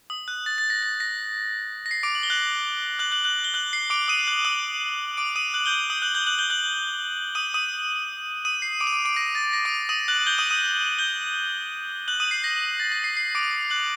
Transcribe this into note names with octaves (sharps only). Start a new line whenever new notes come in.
D#6
F#6
A6
A6
A#6
A6
A#6
A#6
C7
D6 D7
F#7
G7
F#6 F#7
F#6 F#7
F#6 F#7
F#6 F#7
G7
F#6 F#7
C7
D6 D7
D#6 D#7
F#6 F#7
D#6 D#7
D6 D7
D#6 D#7
F#6 F#7
G6 G7
D#6 D#7
F#6 F#7
G6 G7
F#6 F#7
G6 G7
F#6 F#7
D#6 D#7
D#6 D#7
D#6 D#7
C7
D6 D7
D#7
D6 D7
D6 D7
A#6
A6
A#6
D6 D7
D#6 D#7
F#6 F#7
G6 G7
D#6 D#7
D#6 D#7
G6 G7
F#6 F#7
D#6 D#7
C7
A#6
A6
A#6
C7
C7
D6 D7
F#6 F#7